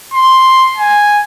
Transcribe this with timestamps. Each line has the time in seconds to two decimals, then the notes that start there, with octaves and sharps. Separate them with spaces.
0.14 C6
0.77 G#5